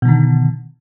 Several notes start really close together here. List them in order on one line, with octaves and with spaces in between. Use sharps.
B2 D3 D#3